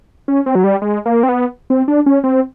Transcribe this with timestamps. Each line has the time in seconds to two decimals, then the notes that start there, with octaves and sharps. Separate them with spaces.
0.28 C#4
0.46 C4
0.55 F#3
0.64 G3
0.82 G#3
1.06 A#3
1.23 C4
1.29 B3
1.70 C4
1.88 D4
2.06 C#4
2.24 C4